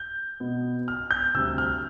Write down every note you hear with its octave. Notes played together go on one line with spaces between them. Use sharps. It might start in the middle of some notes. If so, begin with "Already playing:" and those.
Already playing: G6
B2 B3
F6
G6
D2 C3 G3 E6
F6